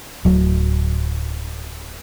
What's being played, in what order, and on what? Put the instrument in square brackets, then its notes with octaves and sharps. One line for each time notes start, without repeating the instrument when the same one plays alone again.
[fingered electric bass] D1 F#3